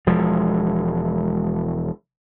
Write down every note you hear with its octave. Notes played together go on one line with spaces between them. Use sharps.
E1 F3 G#3